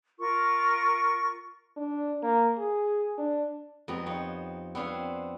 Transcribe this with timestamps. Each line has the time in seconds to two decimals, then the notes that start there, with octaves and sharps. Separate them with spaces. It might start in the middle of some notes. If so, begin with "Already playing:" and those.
0.18 F4 A#4 C#6
1.77 D4
2.23 A#3
2.58 G#4
3.18 D4
3.88 F2 B3 G4 A#5
4.06 F3 D#4 C#5
4.75 B3 C4 D4 C5 C#5 F5